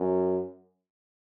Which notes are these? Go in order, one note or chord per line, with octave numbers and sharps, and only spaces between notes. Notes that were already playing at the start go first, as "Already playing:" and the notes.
Already playing: F#2